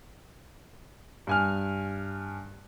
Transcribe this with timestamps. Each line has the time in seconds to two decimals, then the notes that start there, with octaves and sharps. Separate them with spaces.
1.27 G2 G#5 F6